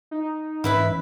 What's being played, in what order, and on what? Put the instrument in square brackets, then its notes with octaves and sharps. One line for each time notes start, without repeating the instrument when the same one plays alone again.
[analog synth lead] D#4
[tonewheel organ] G#2 E3 C#4 [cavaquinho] E4 B4 E5